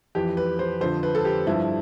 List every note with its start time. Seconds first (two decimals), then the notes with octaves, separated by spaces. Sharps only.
0.15 F2 E3 G4
0.37 B4
0.59 C5
0.81 F2 D3 F3 C5
1.03 B4
1.15 A4
1.25 G4
1.47 G2 F3 E4